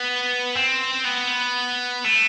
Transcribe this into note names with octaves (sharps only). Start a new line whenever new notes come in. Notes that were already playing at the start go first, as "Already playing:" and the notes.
Already playing: B3
C4
B3
A3